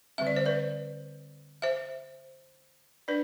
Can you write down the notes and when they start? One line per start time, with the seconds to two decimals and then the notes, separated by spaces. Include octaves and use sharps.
0.18 D3 G3 C4 E5
0.27 D5
0.36 C5
0.46 B4 D5
1.62 C5 E5
3.08 D4 B4 D5